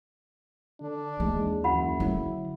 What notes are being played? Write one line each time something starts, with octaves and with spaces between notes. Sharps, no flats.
D3 D4
D#2 E3 G#3
F#1 E4 F#4 F#5 B5
D3 F#3